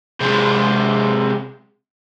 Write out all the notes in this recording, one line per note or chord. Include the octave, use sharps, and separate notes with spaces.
C3 G#3